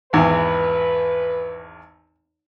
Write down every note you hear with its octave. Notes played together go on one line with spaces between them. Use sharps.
G#1 E2 B4